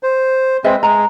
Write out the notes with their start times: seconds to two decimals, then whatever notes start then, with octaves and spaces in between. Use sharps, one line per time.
0.03 C5
0.64 G#3 C4 B4 D#5 E5
0.83 G#3 A#5